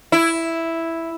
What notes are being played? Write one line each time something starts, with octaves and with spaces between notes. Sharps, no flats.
E4